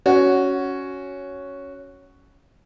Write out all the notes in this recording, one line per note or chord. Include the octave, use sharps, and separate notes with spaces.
C#4 F#4